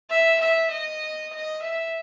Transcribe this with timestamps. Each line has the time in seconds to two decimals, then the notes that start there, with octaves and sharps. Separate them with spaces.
0.10 E5
0.41 E5
0.71 D#5
1.33 D#5
1.63 E5